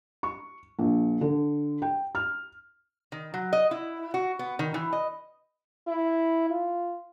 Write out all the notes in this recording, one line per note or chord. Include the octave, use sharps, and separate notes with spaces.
C#6
A#1
D3
G5
F6
D#3
F#3
D#5
E4
F#4
B3
D#3
E3
D#5
E4
F4